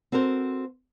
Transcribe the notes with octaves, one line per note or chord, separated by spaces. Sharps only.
C4 F#4 A4 A#4 C5